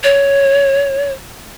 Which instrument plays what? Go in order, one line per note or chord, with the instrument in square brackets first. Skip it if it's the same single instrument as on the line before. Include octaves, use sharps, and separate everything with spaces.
[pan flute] C#5